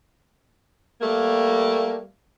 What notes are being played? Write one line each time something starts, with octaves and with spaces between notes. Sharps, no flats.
G3 A3 A#3